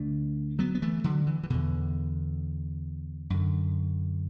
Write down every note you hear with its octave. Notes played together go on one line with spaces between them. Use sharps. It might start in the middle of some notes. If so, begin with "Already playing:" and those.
Already playing: D2 D3 A3 D4
F#3 B3
B3
E3 A3
D3 F#3
E3
E3
E2 B2 D3
F#2 D3